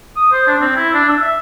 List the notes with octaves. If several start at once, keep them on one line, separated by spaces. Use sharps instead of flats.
D#6
C5
D4
C4
E4
D4
E6
E5